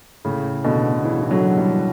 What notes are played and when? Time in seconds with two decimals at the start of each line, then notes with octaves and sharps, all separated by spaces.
0.25 A2 C#3
0.64 B2 D3
1.04 C#3 E3
1.22 E3
1.31 D3 F#3
1.58 E3 G3